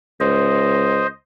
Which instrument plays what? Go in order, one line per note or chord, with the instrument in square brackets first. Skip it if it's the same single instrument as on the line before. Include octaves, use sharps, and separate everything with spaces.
[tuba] C#2 [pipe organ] C5 D#5